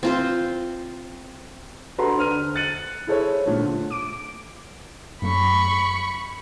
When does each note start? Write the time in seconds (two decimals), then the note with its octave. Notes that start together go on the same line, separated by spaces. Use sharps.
0.03 C4 F4 C5
1.98 D4 F#4 A4 B4 A#5 C6
2.17 D3 C5 F6 D#7
2.55 F#6 A6 C#7 D#7 F#7
3.07 E4 G#4 A4 C5 C#5
3.46 A#2 D3 A3
3.90 D6 D7
5.22 F#2 F#3 A3 B5 C#6